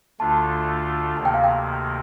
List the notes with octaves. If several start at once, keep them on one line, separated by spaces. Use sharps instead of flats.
D2 D3 A3 D4 F4 A5
D2 C3 D#3 A#3 A5
G5
F5
G5